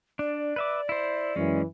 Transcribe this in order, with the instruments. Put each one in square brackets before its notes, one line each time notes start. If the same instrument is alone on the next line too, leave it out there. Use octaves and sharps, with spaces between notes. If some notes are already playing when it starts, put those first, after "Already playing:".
[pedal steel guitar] D4 [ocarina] D5
[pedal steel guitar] B4 E5 D6
E4 C5
[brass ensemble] F#2 E3 [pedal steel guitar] G#3 C#4